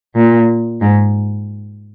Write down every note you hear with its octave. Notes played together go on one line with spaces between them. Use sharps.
A#2
G#2